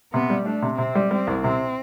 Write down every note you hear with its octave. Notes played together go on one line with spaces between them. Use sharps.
C3 B3
G3
A3 D4
C3
C3 C4
G3
G3 C4
C2
C3 C4